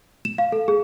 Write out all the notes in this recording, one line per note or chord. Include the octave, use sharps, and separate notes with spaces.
E7
F5
A4
G#4